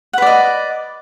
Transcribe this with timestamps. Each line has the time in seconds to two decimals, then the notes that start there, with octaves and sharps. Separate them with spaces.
0.13 F#5
0.18 B4
0.22 D5
0.27 D#5